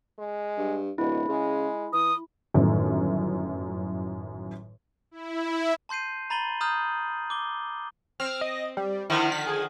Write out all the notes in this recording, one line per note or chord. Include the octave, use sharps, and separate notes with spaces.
G#3
G2
D1 B2 E4
C#3 G#3
E3 D#6
G1 F#2 A2 D#3
E4
A5 C6 G6 C7 D#7
A#5 B5 A6 D#7 F#7 G7
A#5 D#6 F6 G6
D6 G7
C4 F6
D#5
G3
D3 D#3 F3 E4
B6
G#4